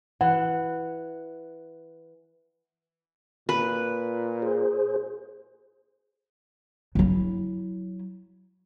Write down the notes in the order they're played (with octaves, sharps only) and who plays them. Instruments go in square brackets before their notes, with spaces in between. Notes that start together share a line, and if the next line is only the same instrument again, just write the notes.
[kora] E3 [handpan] F#5
[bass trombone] A#2 [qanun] B4
[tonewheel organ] G#4 C5
[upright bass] F#3 E4